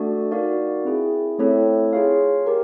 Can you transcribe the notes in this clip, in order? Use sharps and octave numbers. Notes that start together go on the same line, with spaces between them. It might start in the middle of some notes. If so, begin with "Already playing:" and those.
Already playing: A3 D4 F#4 A4 D5
D#4 F#4 A#4 D5 F5
C4 E4 G#4
A3 C4 E4 A4 C#5
F4 G#4 C#5 F5
G4 A#4